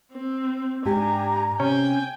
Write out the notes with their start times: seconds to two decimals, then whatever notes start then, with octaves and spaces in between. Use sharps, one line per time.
0.12 C4
0.86 G#2 D4 G4 G#5 A#5
1.60 C3 C#4 G5 G#5